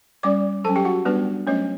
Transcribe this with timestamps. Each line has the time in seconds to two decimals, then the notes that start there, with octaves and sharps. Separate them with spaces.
0.23 G3 C#4 D5 D6
0.64 F#3 C#4 A4 A5
0.76 G4 G5
0.85 F#4 F#5
1.05 G3 B3 D4 B4
1.47 F#3 A3 C#4 C#5